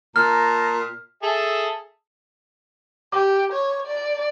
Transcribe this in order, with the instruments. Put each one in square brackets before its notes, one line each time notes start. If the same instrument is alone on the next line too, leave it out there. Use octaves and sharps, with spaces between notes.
[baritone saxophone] A#2 [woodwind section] A5 A#5 [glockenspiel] F6
[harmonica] G#4 A4 E5
[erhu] G4 [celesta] D6
[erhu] C#5
D5